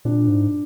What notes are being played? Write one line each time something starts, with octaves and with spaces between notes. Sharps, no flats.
A#2 D4
G#2